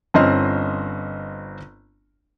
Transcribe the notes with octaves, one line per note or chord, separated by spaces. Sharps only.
G1 C4 C#4 D#5 C6 F6